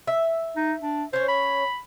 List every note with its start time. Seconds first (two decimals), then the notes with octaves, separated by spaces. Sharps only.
0.07 E5
0.57 D#4
0.83 D4
1.13 C#4 C5 C#5
1.28 B5